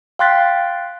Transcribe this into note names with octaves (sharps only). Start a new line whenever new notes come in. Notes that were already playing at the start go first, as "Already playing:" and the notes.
F5 G5 C6 F#6 A6 B6